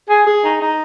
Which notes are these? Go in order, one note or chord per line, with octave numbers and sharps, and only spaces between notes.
G#4
G#4
D#4
D#4